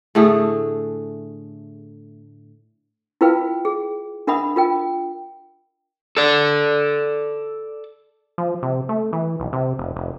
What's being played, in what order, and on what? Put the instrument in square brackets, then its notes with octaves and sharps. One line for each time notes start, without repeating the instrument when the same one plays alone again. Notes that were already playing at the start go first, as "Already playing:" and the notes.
[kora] A2 D3 A3 G#4
[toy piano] E4 F4 A#4 B4 F5 G5
G#4
D4 A#4 E5 F#5 B5 D#6
F4 A#4 G5
[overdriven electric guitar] A4 D5
[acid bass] F3
C3
A3
E3
B1
C3
F1
F1